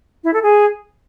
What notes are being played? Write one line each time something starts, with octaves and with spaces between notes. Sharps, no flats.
E4
A4
G#4